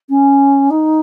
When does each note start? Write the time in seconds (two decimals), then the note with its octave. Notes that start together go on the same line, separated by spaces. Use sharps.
0.09 C#4
0.70 D#4